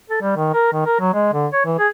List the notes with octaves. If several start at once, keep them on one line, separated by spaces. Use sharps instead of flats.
A4
G3
D#3
A#4
D#3
A#4
F#3
G#3
D3
C#5
E3
G#4